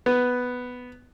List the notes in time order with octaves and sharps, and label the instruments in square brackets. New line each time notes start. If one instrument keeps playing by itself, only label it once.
[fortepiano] B3